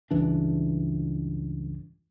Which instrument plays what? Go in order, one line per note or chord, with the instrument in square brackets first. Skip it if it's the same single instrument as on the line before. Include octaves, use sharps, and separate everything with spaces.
[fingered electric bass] C#2 G2 E3 D4